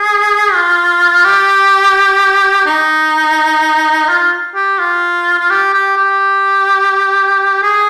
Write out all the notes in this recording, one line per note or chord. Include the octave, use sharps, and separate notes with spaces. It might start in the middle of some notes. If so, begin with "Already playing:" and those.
Already playing: G#4
F4
G4
D#4
F4
G4
F4
F4
G4
G4
G4
G#4